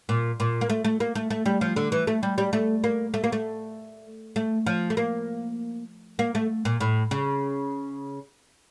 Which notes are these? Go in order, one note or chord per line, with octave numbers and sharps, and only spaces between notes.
A#2
A#2
A#3
A3
A3
A#3
A3
A3
G3
F3
D3
E3
A3
G3
G3
A3
A#3
A3
A#3
A3
A3
F3
A3
A#3
A#3
A3
A#2
A2
C#3